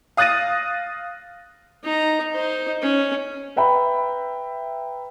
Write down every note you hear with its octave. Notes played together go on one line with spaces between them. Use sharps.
F5 D#6 F#6 A6 A#6 D#7
D#4 A#5
D#4 C5
C#4
B4 E5 G5 A#5 B5